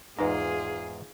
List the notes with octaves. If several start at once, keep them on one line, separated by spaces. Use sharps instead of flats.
E2 G#2 D#4 F4 G#4 B4 D#5